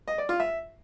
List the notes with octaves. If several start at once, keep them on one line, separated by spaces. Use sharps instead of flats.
D#5
D5
F4
E5